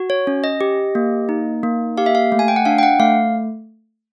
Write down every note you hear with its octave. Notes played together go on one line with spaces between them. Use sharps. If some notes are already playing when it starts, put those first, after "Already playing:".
Already playing: F#4
C#5
C#4
D#5
G4
A#3
D#4
A#3
G4 F5
E5
F5
A3
G#5
G5
F#5
D4 F5
G5
F#5
A3 F5